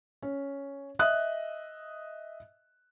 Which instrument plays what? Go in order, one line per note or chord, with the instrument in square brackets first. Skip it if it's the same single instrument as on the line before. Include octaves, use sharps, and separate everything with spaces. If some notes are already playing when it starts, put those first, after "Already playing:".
[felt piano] C#4
D#5 E5 D#6 F#6